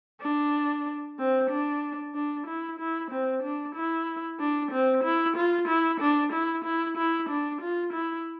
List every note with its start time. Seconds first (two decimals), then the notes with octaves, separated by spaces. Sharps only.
0.22 D4
1.18 C4
1.50 D4
2.14 D4
2.47 E4
2.79 E4
3.11 C4
3.43 D4
3.75 E4
4.40 D4
4.72 C4
5.04 E4
5.36 F4
5.68 E4
6.01 D4
6.32 E4
6.65 E4
6.97 E4
7.29 D4
7.61 F4
7.93 E4